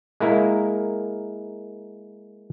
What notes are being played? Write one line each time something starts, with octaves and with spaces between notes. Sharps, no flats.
G#3 A#3 E4 A#4 F5